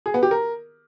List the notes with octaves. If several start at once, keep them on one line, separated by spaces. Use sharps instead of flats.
G#4
B3
G4
A#4